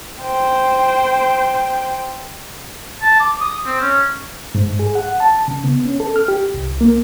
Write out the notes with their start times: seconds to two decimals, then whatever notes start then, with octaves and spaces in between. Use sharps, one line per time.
0.23 C5 G5
3.02 A5
3.20 D6
3.41 D#6
3.66 C4
3.81 C#4
4.55 G#2
4.79 G#4
4.95 F#5
5.20 A5
5.48 C#3
5.64 B3
5.85 C#4
6.00 A4
6.16 F6
6.28 G4
6.54 C2
6.81 A#3